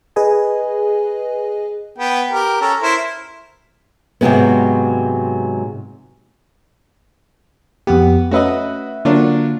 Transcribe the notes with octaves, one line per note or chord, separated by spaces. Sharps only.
G#4 B4 D#5 G#5
B3 G5
G4 A#4
C#4 A4 A#5
E4 A#4 C5
G#2 C3 F#3 G#3 B3
F2 B3 G4
A3 C#4 F#4 B4 D#5 E5
D3 F#3 A#3 D4 F4